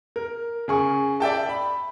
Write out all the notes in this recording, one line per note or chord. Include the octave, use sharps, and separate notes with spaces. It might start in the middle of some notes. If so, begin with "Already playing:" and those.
A#4
C#3 G#4 C#6
D5 E5 G5 A5
B5